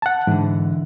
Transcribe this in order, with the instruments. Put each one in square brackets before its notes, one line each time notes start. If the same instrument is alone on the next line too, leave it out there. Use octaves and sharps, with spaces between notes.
[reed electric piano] F#5 A5
[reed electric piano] G#2 [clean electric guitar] D3 E3